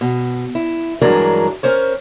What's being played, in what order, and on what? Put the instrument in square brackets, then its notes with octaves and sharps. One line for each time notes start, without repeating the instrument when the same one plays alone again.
[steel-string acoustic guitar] B2
E4
G2 E3 F#3 G#3 D4 A#4
C#4 A#4 C5 C#5